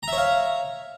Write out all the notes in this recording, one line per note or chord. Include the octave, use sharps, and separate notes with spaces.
C#5 E5 F5 A#5